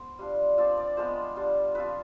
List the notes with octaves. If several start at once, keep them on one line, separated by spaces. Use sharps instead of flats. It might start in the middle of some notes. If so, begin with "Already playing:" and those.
Already playing: B3 C5
G3 D4 F4
F3 C4 F4 D5
D5
F3 G#3 B3 F4 C5
G3 D4 F4
F3 C4 F4 B4